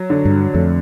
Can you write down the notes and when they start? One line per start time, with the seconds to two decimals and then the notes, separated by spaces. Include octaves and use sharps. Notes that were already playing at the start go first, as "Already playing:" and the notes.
Already playing: F#3
0.10 D3
0.25 G2
0.54 F2 A3